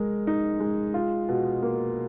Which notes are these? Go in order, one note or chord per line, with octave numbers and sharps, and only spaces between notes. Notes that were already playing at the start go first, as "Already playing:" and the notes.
Already playing: G#3 A#4
D#4
G#3
F4
B2
A#3